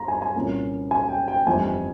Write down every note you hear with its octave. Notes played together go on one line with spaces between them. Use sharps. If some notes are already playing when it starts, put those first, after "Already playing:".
Already playing: G2 A#5 C6
G#5
A#5
G#5
C2 A#2 F3 A#3 C#4
G#5
G5
G5
G1 F2 E3 G3 G#5